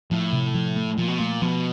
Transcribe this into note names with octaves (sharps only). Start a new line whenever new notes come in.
A2 F3
C3
F3
A3
A#2 F3
B2
A#2 A3
B2 F3